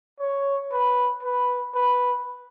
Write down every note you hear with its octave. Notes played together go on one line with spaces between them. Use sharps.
C#5
B4
B4
B4